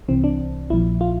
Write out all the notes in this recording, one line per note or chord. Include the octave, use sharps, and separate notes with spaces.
C2 C3 E3 C4
D4
A#1 A#2 F3 E4
F4